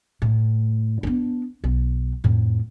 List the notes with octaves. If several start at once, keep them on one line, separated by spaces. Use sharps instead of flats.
A2
B3 D4
B1
F2 A2